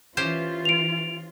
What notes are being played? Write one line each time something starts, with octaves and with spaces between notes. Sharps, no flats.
E3 C#4 F4 G4 C5
D7 F7